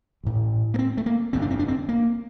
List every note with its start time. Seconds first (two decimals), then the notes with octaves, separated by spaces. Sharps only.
0.24 A1 A2
0.74 A#3
0.79 C4
0.97 A3
1.06 A#3
1.33 G1 F2 C3 C4
1.42 D4
1.51 C4
1.59 D4
1.68 C4
1.89 A#3